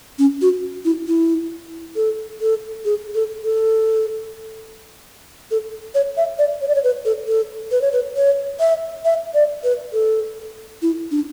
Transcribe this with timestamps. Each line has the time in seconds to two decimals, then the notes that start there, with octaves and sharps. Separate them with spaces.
0.19 C#4
0.41 F#4
0.85 E4
1.07 E4
1.96 A4
2.41 A4
2.85 G#4
3.15 A4
3.44 A4
5.51 A4
5.95 C#5
6.17 E5
6.39 D5
6.61 C#5
6.68 D5
6.75 C#5
6.84 B4
7.05 A4
7.28 A4
7.71 B4
7.81 C#5
7.92 B4
8.16 C#5
8.60 E5
9.05 E5
9.34 D5
9.64 B4
9.93 A4
10.82 E4
11.11 D4